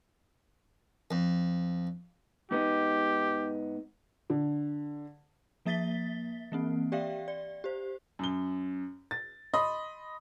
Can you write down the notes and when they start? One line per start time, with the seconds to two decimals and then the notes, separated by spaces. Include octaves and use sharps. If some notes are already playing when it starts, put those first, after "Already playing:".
1.11 F2
2.51 G#2 B3 D#4 G4
4.30 D3
5.66 F3 A#3 E5 A6 B6 G7
6.52 E3 A#3 C4
6.92 G4 D5 E5 F5 G5
7.28 D5
7.64 G4 C5
8.19 F#2 G7
9.11 A6
9.54 D#5 B5 C6 D#6